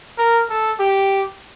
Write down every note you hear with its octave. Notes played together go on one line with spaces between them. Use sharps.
A#4
A4
G4